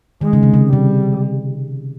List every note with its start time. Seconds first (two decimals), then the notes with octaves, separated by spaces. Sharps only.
0.21 D#3 G#3
0.33 C#3
0.43 C3
0.54 C#3
0.73 C3 G3